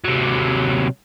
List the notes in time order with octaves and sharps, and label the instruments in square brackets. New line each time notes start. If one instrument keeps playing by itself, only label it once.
[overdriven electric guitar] C3 F#3